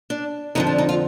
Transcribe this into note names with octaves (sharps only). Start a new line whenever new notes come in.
D4
F2 D3 F3 D#4
D4
D#4
F4